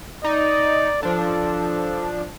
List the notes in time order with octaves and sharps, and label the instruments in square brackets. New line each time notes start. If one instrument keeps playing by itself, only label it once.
[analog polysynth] D#4 [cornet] D5
[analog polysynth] F3 D4 [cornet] A4